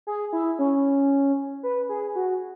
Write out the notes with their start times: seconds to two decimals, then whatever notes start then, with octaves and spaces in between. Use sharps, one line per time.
0.07 G#4
0.33 E4
0.59 C#4
1.63 B4
1.89 G#4
2.15 F#4